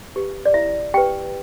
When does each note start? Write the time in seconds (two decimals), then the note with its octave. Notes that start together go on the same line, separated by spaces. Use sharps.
0.16 G4 B4
0.46 D5
0.54 E4 E5
0.94 G4 B4 G5